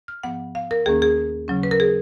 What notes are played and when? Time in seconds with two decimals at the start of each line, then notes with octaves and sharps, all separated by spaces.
0.08 F6
0.23 G#2 F3 B3 F#5
0.55 F5
0.71 A#4
0.86 D#2 D#3 A#3 C#4 G#4
1.02 G#4
1.48 C#3 F#3 C#4
1.63 B4
1.71 A#4
1.80 G#4